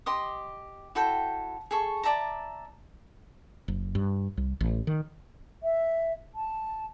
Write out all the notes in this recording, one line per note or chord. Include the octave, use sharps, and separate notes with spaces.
G4 D#5 C6 D#6
E4 F#4 A4 G5
G#4 A4 C#6
D5 E5 A5 A#5
F#1
G2
C2
A1
D#3
E5
A5